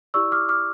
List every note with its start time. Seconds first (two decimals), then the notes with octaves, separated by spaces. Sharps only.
0.14 E4 G4 D5 C#6 E6
0.32 D6 F6
0.49 D6 F6